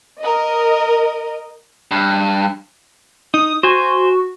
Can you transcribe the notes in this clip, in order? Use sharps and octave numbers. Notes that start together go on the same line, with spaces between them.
A#4 D#5
G2
D#4 D#6
F#4 C5 G#5